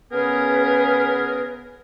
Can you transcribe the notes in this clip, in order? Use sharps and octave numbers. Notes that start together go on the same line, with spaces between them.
C#3 B3 C#4 G#4 A#4 B4